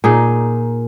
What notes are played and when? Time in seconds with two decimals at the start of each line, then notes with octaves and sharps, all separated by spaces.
0.04 A#2 D#4 G#4